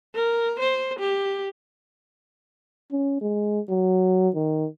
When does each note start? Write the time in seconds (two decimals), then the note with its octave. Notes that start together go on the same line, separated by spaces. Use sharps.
0.15 A#4
0.60 C5
1.00 G4
2.92 C#4
3.21 G#3
3.69 F#3
4.34 D#3